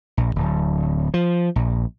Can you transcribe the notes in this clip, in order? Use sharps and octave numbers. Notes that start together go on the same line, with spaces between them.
A#1
D1
F3
A#1